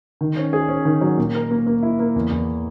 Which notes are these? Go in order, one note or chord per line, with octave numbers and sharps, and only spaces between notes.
D#3
C#4
G#4
C#4
D#3
F#3
A#2
A#4
A#3
A#3
E4
A#3
E2
E2